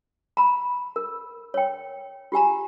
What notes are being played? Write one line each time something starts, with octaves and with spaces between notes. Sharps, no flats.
A#5 B5
A#4
C#5 G5
F4 G4 G#5 A#5